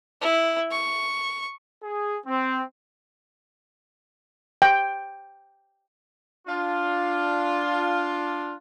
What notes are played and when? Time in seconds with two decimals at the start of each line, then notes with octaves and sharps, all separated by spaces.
0.21 E4
0.71 C#6
1.83 G#4
2.25 C4
4.62 G5
6.48 D4 F4